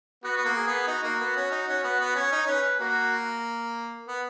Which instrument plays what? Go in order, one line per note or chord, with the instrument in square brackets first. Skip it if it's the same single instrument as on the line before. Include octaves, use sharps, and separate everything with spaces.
[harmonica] B3 [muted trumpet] F#4
[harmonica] B3
A#3
[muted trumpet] G#4
[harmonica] B3
[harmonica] D#4 [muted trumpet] F#4
[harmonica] A#3
B3
C#4
D#4
C#4
B3
B3
[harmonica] C#4 [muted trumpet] C#5
[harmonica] D#4
[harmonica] C#4 [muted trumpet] B4
[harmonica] A#3 [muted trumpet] F#4
[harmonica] B3